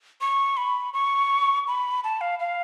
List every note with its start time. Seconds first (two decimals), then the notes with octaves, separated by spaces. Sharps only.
0.21 C#6
0.57 B5
0.94 C#6
1.67 B5
2.04 A5
2.21 F5
2.39 F5